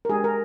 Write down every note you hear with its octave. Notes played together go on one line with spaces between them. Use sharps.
A#4
G#3 D4 G4 G#4
A#4